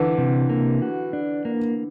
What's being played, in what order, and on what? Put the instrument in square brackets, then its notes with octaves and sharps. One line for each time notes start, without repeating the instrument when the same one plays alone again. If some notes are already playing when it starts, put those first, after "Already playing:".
Already playing: [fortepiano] D3 E3
[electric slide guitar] C3
A#3
F#4
D4
A#3